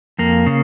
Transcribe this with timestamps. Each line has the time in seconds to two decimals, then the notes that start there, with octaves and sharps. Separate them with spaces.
0.19 F2 A#3
0.46 C#3